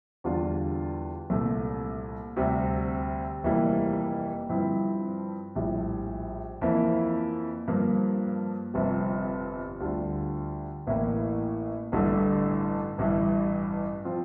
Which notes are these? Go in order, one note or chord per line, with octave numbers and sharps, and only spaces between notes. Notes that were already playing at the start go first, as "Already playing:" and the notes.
E2 D3 G3 D4 F4
C2 A#2 A3
D2 C3 G3
F1 F2 E3 G3 A#3
G2 F3 C4 E4
A#1 A2 G3
F2 E3 A#3 E4
G2 F3 A#3
G1 F2 C3
D2 D3 G3 D4 F4
A1 A2 E3 A#3
A1 G2 D3 A3
A1 G2 E3
F3 C4 F4